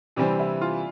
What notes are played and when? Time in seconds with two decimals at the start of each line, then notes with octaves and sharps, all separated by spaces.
0.16 C3 E3 G3 C4 D4
0.40 E4
0.61 F4